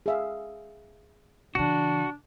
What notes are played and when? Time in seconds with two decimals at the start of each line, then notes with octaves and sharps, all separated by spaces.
0.06 G#4 E5 F5
1.55 C#3 E3 D4 F#4